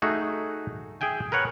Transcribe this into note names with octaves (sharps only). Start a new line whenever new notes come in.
A3 D#4 F#4 G#4
G#4 E5 G5 G#5
A#4 B4 C#5 F#5